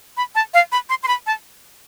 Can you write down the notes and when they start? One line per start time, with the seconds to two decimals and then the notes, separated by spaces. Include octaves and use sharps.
0.17 B5
0.35 A5
0.54 F5
0.72 B5
0.89 C6
1.03 C6
1.08 B5
1.26 A5